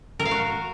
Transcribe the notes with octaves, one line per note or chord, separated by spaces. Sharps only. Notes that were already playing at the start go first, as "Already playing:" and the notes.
A#4
F5
F#4